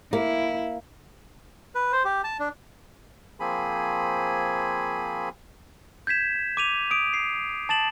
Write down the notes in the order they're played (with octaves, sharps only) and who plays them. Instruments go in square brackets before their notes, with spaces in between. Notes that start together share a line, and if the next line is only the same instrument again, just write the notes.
[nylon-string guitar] A#3 [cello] E4
[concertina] B4
C5
G4
A5
D4
[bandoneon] F3 A#3 C4 G#4 G#5 B5
[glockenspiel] G6 G#6 B6 E7
D6 D#7 F7
D#6 D7
C7
A5 A6 E7 F#7